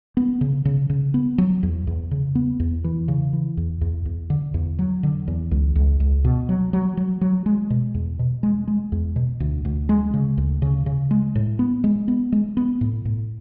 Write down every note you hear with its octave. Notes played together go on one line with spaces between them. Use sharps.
B3
C#3
C#3
C#3
B3
F#3
E2
E2
C#3
B3
E2
E3
C#3
E3
E2
E2
E2
D3
E2
F#3
D3
E2
C#2
C#2
C#2
B2
F#3
F#3
F#3
F#3
G#3
B2
E2
B2
G#3
G#3
E2
B2
D2
D2
G#3
C#3
D2
C#3
C#3
G#3
A2
B3
G#3
B3
G#3
B3
A2
A2